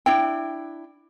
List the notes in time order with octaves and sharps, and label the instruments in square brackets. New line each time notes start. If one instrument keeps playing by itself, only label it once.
[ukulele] D4 E4 G5